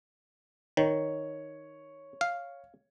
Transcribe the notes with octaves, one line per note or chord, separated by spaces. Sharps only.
D#3 C#5
F5